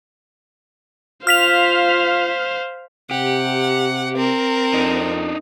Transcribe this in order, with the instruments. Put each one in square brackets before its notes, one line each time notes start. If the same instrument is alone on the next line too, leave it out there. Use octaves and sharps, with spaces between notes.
[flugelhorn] F4 [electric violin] C5 F5 [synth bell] F6 B6 F7
[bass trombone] C3 [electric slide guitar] G4 [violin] F#5
[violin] C4 A#4
[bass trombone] F2 [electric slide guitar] D4 D#4